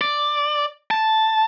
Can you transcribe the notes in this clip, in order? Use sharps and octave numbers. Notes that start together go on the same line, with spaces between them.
D5
A5